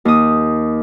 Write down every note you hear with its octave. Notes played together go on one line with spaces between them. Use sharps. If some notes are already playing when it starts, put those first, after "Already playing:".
D#2 D#6